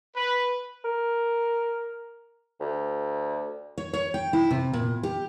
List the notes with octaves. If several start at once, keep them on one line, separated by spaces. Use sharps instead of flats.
B4
A#4
D2
C#5
C#5
G5
E4
C3
A#2
G4